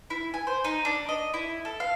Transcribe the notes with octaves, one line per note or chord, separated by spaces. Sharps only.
E4
G#5
C5
D#4
D4
D#5
E4
A4
F5